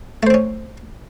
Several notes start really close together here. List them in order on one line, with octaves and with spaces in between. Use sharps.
A3 C5 C4 C#4